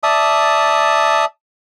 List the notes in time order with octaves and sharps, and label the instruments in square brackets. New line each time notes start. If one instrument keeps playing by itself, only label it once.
[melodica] D5 E5 A5 D#6